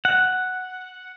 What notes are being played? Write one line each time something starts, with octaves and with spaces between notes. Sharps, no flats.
F#5